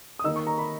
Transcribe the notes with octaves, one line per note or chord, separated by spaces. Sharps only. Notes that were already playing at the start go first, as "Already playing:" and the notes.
D#6
D#3 A#3 D#4 E6
C#6
A#5
B5